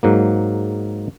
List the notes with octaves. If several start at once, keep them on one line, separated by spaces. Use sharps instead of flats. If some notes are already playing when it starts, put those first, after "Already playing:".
G#2 F#3 A#3